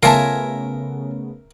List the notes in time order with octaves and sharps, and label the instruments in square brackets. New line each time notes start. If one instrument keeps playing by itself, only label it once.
[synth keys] C#3 A3 B3 [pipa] F4 G#5 A5 [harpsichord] A#4 E5